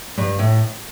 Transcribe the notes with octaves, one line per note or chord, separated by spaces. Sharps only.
G2
A2